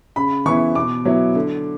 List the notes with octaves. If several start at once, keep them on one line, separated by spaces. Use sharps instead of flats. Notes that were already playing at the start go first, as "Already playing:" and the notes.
C#3 B5
E3 B3 E4 C#6
B2 D6
F#3 B3 E4
D3